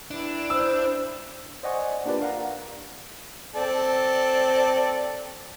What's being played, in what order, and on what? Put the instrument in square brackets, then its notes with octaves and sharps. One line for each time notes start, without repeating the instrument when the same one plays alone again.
[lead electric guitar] D4 [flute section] E4 B4 G5
[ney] C5 [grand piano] E6
[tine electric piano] C5 D5 D#5 F#5 G#5 C#6
A#3 D4 F4 G4 B4 D5
A#4 F5 F#5 A#5
[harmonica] C4 A4 D5